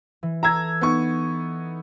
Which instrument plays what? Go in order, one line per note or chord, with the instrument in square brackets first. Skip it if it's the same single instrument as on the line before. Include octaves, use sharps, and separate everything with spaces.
[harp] E3
[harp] A4 [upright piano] A#5 E6 G#6
[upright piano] B3 D#4 C#6